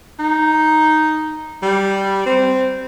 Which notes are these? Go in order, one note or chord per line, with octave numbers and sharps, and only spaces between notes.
D#4
G3
C4